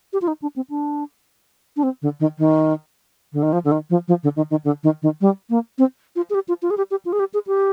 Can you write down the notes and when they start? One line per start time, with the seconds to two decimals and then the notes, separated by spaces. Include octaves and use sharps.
0.13 G4
0.22 F4
0.28 D#4
0.42 D4
0.56 C4
0.70 D4
1.77 D4
1.83 C4
2.02 D3
2.20 D#3
2.39 D#3
3.33 D3
3.43 D#3
3.53 F3
3.65 D3
3.72 D#3
3.90 F3
4.08 F3
4.23 D3
4.36 D#3
4.51 D#3
4.65 D3
4.83 D#3
5.02 D#3
5.21 G3
5.50 A#3
5.78 C4
6.16 F4
6.30 G#4
6.34 G4
6.48 F4
6.62 F4
6.71 G#4
6.77 G4
6.91 G4
7.05 F4
7.13 G#4
7.20 G4
7.34 G#4
7.47 G4